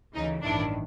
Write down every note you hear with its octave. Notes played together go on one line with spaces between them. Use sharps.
D2 C#3 E3 D#4
A1 G2 D#3 D4 E4